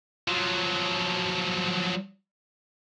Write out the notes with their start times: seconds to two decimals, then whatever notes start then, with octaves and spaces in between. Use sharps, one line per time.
0.28 F3 F#3